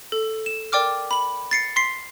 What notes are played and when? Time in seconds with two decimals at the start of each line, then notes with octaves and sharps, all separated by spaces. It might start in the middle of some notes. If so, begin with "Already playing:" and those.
0.12 A4
0.46 E7
0.72 A#4 D5 G5 D6 F6
1.11 B5 F#7
1.51 A6 C7 C#7
1.76 C6 B6 C7